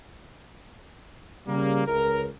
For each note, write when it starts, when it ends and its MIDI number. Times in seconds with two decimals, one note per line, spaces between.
1.47 1.84 49
1.47 1.84 55
1.47 1.84 58
1.87 2.27 37
1.87 2.27 70